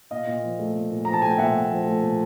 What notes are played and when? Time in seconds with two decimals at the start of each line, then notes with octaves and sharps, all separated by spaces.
0.11 A#2 D#5 F5
0.27 A#2
0.44 F3
0.59 A3
0.75 A#2
0.91 A#2
1.05 F3 A#5
1.13 A5
1.22 A3 G#5
1.30 G5
1.38 A#2 E5 F#5
1.55 A#2
1.70 F3
1.86 A3
2.02 A#2